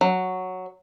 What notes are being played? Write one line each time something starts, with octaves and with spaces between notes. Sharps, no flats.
F#3